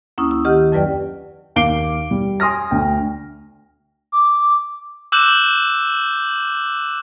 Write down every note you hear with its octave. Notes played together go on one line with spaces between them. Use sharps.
D2 A#3 C#4 E4 D#6
E4
D#3 G4 D#5 F#5 F6
F2 F#3 B4 D5 G5
D#2 F5 D6 C7 D7 G7
G3
G#5 C6 D#6 F6 A#6
D2 G5
D6
D6 E6 F#6 G6 E7 F#7